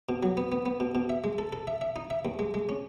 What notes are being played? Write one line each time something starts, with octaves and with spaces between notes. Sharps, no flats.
B2
F#3
B3
B3
B3
B2
B2
E5
G#3
A4
A4
E5
E5
D#4
E5
D#2
G#3
G#3
C#4